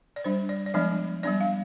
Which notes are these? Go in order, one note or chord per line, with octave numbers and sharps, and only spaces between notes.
D5
G3 D4 C5
D5
D5
F3 G#3 B3 D4 D#5
G3 B3 D4 D5
F5